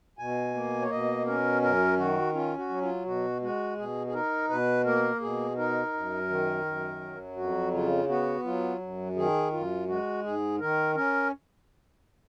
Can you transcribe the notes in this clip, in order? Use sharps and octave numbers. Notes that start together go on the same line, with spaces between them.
B2 G#5
A#3
C#5
B2 D#5
C#4 A#4
F#2 A#4
D#3 F#4
C#4 F4
F#4
F#3
F4
B2 F#4
G#3 F#4
B2 G#4
G#4
D#4 A#4
B2 B4
A#3 A#4
B2 G#4
D#4 A#4
F#2
D#3
F#2
F#3
F2 F#4
C#3 F4
B3 F#4
F#3 F4
F#2
D#3 G#4
F#2 F4
G#3 F#4
G#2 G#4
D#3 A#4
C#4 A#4